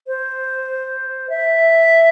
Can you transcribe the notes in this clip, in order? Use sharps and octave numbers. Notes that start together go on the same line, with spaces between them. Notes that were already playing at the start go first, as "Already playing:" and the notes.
C5
E5